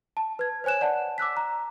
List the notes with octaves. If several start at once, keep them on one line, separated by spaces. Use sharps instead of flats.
A5
B4 G#6
C5 C#5 G#5 F#6 E7
D5 F#5 A5
D6 E6 F#6 B6
A#5